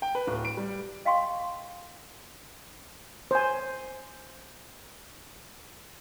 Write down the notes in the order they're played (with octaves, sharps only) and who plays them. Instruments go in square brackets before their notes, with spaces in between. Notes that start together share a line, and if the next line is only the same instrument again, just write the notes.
[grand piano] G5
B4
D1
D7
G3
[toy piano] D#5 F5 G5 C6 C#6
[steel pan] C5 G#5